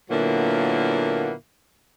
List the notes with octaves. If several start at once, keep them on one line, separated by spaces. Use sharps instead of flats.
A#2 D3 F#3 A#3 B3 E4